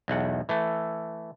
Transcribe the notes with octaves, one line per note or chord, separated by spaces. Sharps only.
B1 E2 F#5
E3 A3